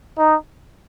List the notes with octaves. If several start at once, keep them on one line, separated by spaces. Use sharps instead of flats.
D#4